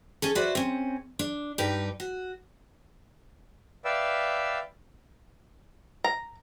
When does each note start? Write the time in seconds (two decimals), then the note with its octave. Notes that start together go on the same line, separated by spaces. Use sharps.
0.22 C#4 G#4 A4
0.35 F#4 B4 C5 D5 E5
0.55 C4 C#4
1.19 D4
1.58 G2 D#4 G4 B4
2.00 F#4
3.85 B4 D5 E5 F5 G5 E6
6.04 A#5